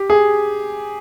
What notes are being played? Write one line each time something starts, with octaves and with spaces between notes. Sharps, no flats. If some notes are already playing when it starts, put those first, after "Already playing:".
Already playing: G4
G#4